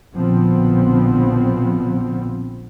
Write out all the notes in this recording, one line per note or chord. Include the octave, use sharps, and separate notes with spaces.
A#1 B2 D3 F3 B3 C4